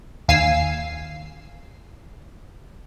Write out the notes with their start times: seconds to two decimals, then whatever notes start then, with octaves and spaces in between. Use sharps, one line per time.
0.28 D#2 F5 G#5 E6 C7